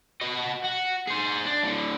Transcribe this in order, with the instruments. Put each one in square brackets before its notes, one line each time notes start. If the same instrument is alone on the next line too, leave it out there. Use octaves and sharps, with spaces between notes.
[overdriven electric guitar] F#4 D#5
F#4
G#4 C5
D4
A2 D3